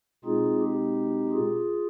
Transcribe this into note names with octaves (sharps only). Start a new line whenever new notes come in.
B2 G#3 C4 D#4 F4 G#4
G4
F4 G#4